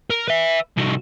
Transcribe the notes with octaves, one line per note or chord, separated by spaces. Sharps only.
A#4
B4 E5
C2 F#4